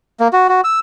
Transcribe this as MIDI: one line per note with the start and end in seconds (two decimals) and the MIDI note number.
0.20 0.28 58
0.33 0.48 66
0.49 0.61 66
0.64 0.80 88